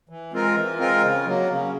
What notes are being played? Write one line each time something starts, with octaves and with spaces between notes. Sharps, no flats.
E3
G#3 C4 F4 A#4
E3
G#3 C4 F4 A#4
C#3
F#3 A#3
C#3